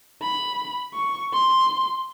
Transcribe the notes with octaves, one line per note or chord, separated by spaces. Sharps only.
B5
C#6
C6